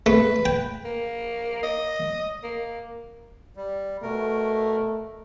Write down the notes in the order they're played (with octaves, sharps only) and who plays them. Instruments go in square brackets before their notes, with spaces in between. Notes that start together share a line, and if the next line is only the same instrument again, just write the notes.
[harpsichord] A3 [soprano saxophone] B4
[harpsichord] G5
[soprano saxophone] A#3
D#5
A#3
[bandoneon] G3
[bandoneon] B2 A#4 [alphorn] A3